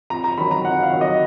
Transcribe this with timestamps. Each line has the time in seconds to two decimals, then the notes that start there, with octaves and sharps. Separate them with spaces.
0.10 F2 A#5
0.24 A#5
0.38 D#3 F#3 B5
0.51 A#5
0.64 F2 F#5
0.82 F5
0.92 D#3 F#3
1.01 D#5